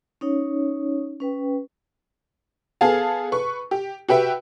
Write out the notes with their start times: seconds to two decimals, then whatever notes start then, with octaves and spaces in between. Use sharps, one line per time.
0.21 C#4 D#4 C#5
1.20 C#4 B4 G5
2.81 B3 G#4 A4 F5 A5
3.32 B4 C#6
3.71 G4
4.09 F#4 G4 B4 E5 G5